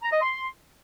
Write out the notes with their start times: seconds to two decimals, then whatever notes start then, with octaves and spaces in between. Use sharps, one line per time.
0.03 A#5
0.12 D#5
0.21 C6